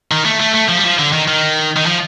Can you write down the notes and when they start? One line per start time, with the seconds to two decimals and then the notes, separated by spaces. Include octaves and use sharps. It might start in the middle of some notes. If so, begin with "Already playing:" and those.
0.11 D#3
0.25 A3
0.40 A3
0.54 A3
0.69 F3
0.78 G3
0.85 F3
0.99 D3
1.13 D#3
1.28 D#3
1.76 D#3
1.86 F3